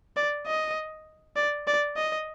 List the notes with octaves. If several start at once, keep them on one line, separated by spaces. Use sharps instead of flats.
D5
D#5
D5
D5
D#5